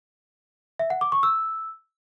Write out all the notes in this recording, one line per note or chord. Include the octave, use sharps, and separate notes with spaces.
E5
F#5
D6
C#6
E6